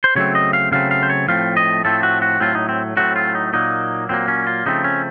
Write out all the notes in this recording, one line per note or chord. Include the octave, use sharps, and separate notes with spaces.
C5
C#3 F#3 A3 C4 C#5
D#5
F5
C#3 F#3 A3 C4 F5
F5
C5
C#5
A2 F3 A3 C4 F5
D#5
A2 F3 A3 C4 A4
F#4
F#4
A2 F#3 A3 C4 F4
D#4
C4
A2 F#3 A3 C4 F#4
F4
D#4
A#2 F#3 A#3 D#4
A#2 F#3 A#3 C4
C#4
F4
C#3 F3 A3 C4 D#4
C#4